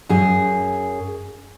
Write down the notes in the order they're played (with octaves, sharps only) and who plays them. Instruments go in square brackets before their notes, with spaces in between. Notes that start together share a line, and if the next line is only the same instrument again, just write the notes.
[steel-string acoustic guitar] F#2 G#4